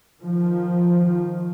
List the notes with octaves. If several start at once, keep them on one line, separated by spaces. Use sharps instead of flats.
D#3 F3